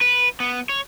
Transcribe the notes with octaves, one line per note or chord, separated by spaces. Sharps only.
B4
B3
C#5